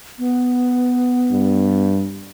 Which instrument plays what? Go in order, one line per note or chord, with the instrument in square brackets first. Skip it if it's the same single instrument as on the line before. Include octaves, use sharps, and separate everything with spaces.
[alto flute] B3
[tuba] G2